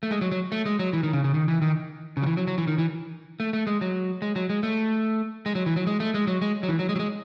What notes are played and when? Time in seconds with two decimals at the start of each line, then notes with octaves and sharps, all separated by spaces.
0.03 A3
0.11 G#3
0.21 F#3
0.32 F#3
0.52 A3
0.66 G#3
0.79 F#3
0.93 E3
1.03 D#3
1.13 C#3
1.24 C#3
1.34 D#3
1.48 E3
1.62 D#3
2.17 C#3
2.23 F#3
2.26 E3
2.37 F#3
2.47 F#3
2.58 E3
2.67 D#3
2.78 E3
3.40 A3
3.53 A3
3.67 G#3
3.81 F#3
4.22 G#3
4.36 F#3
4.50 G#3
4.63 A3
5.46 G#3
5.55 F#3
5.66 E3
5.76 F#3
5.87 G#3
6.00 A3
6.14 G#3
6.27 F#3
6.42 G#3
6.63 F#3
6.69 E3
6.79 F#3
6.89 G#3
6.96 F#3
6.99 G#3